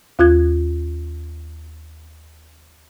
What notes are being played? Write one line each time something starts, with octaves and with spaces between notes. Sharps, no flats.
D#2 F4 F#6 G#6